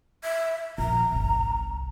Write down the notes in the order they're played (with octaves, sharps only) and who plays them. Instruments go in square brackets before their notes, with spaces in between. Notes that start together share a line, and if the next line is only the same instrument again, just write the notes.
[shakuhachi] E5
[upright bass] A#1 [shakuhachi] A#5
[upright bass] G1 C2